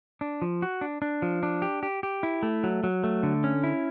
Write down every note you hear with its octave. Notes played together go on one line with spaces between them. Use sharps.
D4
F3
F#4
D4
D4
F3
D4
G4
G4
G4
E4
A3
F#3
F#3
A3
D3
C#4
E4